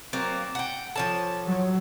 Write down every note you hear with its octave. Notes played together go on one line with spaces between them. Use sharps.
F#3 A#3 C4 D5
F#5 G5
F3 A4 C#5 D5 F#5 A5
F#3